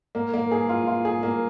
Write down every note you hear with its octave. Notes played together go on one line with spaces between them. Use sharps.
A#3
A#3
G#4
F4
F4
G#4
A#3